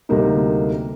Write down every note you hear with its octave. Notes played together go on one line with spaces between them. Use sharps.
D2 C3 G3 A#3 D#4